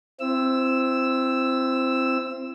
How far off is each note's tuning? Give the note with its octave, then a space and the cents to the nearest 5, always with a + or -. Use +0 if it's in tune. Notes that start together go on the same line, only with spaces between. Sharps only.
C4 +0 E4 +35 E6 +0